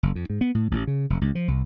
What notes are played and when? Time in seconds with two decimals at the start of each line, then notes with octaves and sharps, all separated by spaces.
0.03 F#1
0.15 F2
0.30 G#2
0.41 B3
0.55 A2
0.71 A1
0.87 C#3
1.10 F1
1.21 C#2
1.35 F3
1.48 C2